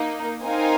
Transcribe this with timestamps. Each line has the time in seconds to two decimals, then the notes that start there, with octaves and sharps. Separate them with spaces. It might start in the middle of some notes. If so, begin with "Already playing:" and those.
Already playing: A#3 D#4
0.44 C4 D#4 A#4 F5 G#5